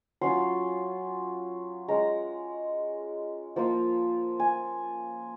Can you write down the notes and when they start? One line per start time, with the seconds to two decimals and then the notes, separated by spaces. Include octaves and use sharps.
0.21 F#3 C#4 F4 C6
1.88 G#3 C#4 F4 A#5
3.56 F3 A#3 F4
4.40 G#5